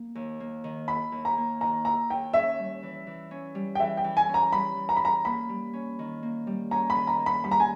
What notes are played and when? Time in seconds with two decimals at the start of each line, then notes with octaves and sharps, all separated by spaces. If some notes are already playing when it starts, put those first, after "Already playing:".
Already playing: A#3
0.15 D#2
0.40 A#3
0.64 D#3
0.88 E4 B5
1.12 D#2
1.25 A#5
1.38 A#3
1.61 D#3 A#5
1.85 E4 A#5
2.10 D#2 G5
2.33 C#4 E5
2.59 G3
2.83 E3
3.07 E3
3.31 C#4
3.55 G3
3.75 G5
3.80 E3 E5
3.97 G5
4.04 E3
4.17 G#5
4.29 C#4
4.34 A#5
4.53 G3 B5
4.76 E3
4.89 A#5
4.97 B5
5.01 E3 A#5
5.25 A#3 B5
5.49 G3
5.73 C#4
5.99 D#3
6.23 A#3
6.47 G3
6.71 C#4 A#5
6.90 B5
6.95 D#3
7.07 A#5
7.19 A#3
7.26 B5
7.44 G3 B5
7.51 A#5
7.60 G#5